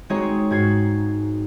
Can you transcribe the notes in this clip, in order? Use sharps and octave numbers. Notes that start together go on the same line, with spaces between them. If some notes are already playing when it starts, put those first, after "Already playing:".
G#3 C4 D#4 F#4 G#4 C#5
G#2 F#4 G#6 C7